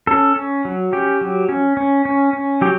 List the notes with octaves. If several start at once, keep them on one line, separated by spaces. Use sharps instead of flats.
C#4 A4
C#4
F#3
C#4 G4
F#3
C#4
C#4
C#4
C#4
F#3 G4